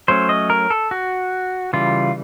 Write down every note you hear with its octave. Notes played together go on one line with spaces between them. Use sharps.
F#3 A3 C#4 C5
D#5
A#4
A4
F#4
C#3 E3 G3 F4